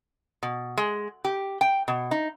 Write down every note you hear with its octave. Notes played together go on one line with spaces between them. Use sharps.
B2
G#3
G4
G5
B2
D#4